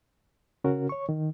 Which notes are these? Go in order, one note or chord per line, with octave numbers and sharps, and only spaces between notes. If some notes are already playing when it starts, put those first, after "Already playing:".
C#3 C#4 F#4 A#4
C#5 C#6
D#3